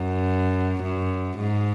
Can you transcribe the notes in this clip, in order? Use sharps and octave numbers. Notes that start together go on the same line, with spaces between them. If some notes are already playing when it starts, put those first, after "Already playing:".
Already playing: F#2
F#2
G#2